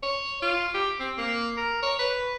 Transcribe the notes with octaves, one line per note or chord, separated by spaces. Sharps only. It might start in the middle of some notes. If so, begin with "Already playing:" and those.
C#5
F4
G4
C4
A#3
A#4
C#5
B4